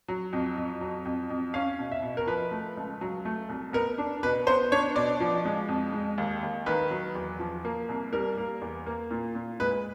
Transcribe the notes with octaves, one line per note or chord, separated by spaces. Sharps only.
F#3
F2
F2
F#3
F2
F2
C#4 F5
B2
E5
B2
A#4
F3 B4
A3
C#2
F#3
A3
C2
B3 A#4
D4
B2 B4
B3 C5
D4 C#5
B2 D5
F3
G#3
F2
G#3
D#2
D#2
D#3 B4
F#3
E2
F3
A#3
C2
G3 A#4
A#3
E2
A#3
A#2
A#2
G#3 B4